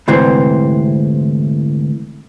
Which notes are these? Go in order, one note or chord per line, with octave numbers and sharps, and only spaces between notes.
D2 G#2 C3 E3 C4